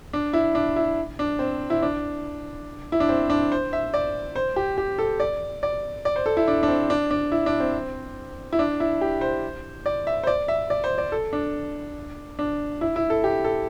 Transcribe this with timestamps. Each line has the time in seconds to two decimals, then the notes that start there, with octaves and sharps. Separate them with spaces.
0.13 D4
0.33 E4
0.55 D4
0.76 E4
1.19 D4
1.39 C4
1.70 E4
1.82 D4
2.92 E4
3.00 D4
3.09 C4
3.30 D4
3.52 C5
3.73 E5
3.94 D5
4.36 C5
4.56 G4
4.78 G4
4.98 A4
5.20 D5
5.63 D5
6.05 D5
6.16 C5
6.26 A4
6.37 E4
6.48 D4
6.63 D4
6.68 C4
6.90 D4
7.11 D4
7.32 E4
7.46 D4
7.60 C4
8.52 E4
8.59 D4
8.80 E4
9.01 G4
9.21 C5
9.86 D5
10.07 E5
10.23 C5
10.27 D5
10.48 E5
10.70 D5
10.84 C5
10.98 D5
11.12 A4
11.33 D4
12.39 D4
12.81 E4
12.96 E4
13.10 A4
13.24 G4
13.44 A4